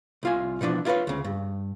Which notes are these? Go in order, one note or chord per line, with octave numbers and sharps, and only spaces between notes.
C2 F4 G#5
B2 E3 F3 D4
E4 F4 A#4 B4 C#5
D2 C#3
G2